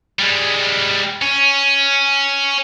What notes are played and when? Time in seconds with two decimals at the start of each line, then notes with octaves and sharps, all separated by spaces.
0.19 G3 G#3
1.22 C#4